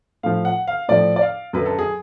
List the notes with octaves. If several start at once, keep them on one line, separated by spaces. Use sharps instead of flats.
A2 F3 F5
F#5
F5
A2 F3 D5
D5
F5
F#2 D3 F#3 B4
A4
G#4